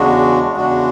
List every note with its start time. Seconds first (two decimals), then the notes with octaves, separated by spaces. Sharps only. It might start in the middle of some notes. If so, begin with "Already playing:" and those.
Already playing: E2 C#3 G#3 D4 F#4
0.56 E2 C#3 G#3 D4 F#4